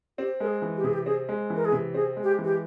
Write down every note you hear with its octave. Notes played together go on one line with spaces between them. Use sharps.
C4 G4
G#3 A#4
G#4
E3
G4
C3 G#4
G4
C4 G#4
G#3
E3
A#4
G#4
C3
C4 G#4
G#3
G4
E3
G4